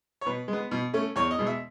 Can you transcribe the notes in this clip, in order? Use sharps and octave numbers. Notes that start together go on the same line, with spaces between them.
C#5
B2 B4
G#3
B3
B2
A3 C#4
E2 C#5
D#5
B2 G#3
E5